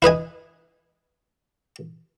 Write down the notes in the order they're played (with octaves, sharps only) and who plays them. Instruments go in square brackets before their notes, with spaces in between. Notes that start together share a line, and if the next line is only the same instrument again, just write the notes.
[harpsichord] E4 B4 D#5 G#5